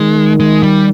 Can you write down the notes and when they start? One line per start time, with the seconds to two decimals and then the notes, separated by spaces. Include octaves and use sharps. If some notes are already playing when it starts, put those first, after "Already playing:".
Already playing: D#3 G#3
0.40 G#3
0.63 G3